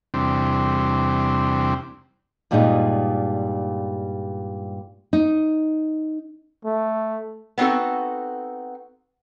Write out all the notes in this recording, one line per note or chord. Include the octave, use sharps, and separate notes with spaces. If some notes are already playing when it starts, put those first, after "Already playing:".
E2 C3 G3 C4 D4
G2 A#2 G3 G#3 D4 D#4
D#4
A3
B3 C4 D#4 F#4 A4